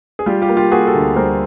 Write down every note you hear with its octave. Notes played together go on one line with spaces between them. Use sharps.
G#4
G3 F4 G4
F4 G4
A#3
F4 G4
A#3 F#4 G#4
G4 A4
D2
G3 A#4 C5